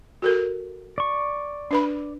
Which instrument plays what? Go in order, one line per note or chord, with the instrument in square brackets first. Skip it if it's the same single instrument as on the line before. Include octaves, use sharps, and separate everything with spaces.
[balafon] F#4 A4 A#4
[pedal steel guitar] D5 C#6
[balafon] D4 B4 B5